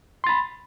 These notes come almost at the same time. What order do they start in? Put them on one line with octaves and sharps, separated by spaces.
C6 A6 B5